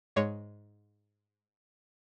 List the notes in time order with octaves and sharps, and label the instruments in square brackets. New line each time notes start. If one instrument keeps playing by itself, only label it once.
[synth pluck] G#2 G#3 C#5